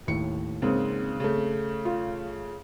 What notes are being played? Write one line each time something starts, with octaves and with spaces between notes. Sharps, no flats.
D#2 A2 C#7
G#1 G#2 C#3 A#3 C4
C#3 A3
F4